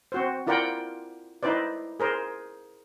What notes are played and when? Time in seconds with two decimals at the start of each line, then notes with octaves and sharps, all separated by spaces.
0.12 C4 F#4 C5
0.47 E4 F4 A#4 D5 F#5 G5
1.43 D#4 E4 B4 C5 D5
2.00 G#4 A#4 C5